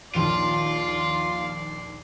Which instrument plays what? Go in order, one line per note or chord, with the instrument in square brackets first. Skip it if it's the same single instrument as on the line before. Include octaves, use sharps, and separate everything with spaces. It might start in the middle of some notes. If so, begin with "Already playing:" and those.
[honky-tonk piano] A#1 D#2 [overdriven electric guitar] F4 [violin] D5 C6